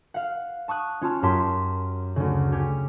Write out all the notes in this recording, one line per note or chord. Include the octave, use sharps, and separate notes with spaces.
F5 F#5
A5 C#6 D#6 F#6
C#4 F4 A5
F#2 G4 C#5 A5 C6 B6
D2 C#3
C#4 G4